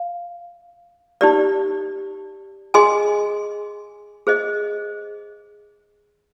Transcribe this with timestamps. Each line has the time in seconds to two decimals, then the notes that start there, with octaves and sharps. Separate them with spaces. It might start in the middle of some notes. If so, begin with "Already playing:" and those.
Already playing: F5
1.21 D#4 G4 D5
2.74 G#4 D#5 G#5 C6
4.27 G#4 C5 D#5